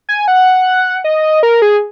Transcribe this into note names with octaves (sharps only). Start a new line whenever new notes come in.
G#5
F#5
D#5
A#4
G#4